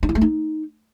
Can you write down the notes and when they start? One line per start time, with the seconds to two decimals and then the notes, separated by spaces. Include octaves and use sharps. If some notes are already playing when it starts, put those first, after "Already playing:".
0.03 D4
0.09 E4
0.15 A3
0.21 D#4